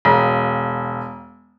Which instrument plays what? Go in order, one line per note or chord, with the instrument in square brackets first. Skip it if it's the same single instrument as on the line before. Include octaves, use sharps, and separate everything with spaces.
[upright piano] E1